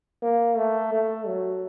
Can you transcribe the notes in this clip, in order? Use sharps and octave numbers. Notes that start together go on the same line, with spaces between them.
A#3
A3
A3
F#3